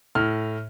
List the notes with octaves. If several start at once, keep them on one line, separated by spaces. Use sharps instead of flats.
A2 F6